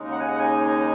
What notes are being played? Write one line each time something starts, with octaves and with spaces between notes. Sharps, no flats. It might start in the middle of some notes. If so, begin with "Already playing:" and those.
Already playing: D#2 C#3 G#3 D#4
F#5
G#5
F#5
G#5